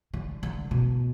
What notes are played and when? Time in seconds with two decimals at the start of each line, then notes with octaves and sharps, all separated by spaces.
0.14 D3
0.43 D3
0.71 B2